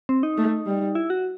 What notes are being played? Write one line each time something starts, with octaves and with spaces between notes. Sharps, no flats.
C4
D#4
A3
G3
E4
F#4